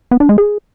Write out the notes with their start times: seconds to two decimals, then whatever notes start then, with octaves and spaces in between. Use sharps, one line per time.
0.11 B3
0.20 D4
0.29 G#3
0.38 G#4